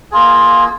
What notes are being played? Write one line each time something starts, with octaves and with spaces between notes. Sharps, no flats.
A#3 F4 G#4